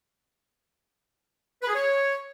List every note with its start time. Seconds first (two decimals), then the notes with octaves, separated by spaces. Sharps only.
1.62 B4
1.69 G#4
1.75 C#5